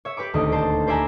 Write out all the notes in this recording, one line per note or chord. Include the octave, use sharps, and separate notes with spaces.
C#5 E5
G4 B4 B5 D6
D#1 D2 A3 D4 D#4 D#5
G4 C5 A5
B4 C5 D5 E5 G#5 A#5